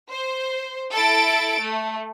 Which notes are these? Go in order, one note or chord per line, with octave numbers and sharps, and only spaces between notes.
C5
E4 A4 A6 D7
A3